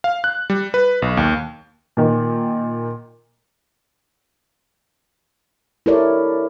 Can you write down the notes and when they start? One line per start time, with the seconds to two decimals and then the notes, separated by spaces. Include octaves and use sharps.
0.04 F5
0.24 F#6
0.50 G3
0.74 B4
1.02 B1
1.17 D#2
1.97 A#2 D#3
5.86 E4 G4 A4 A#4 C#5 D5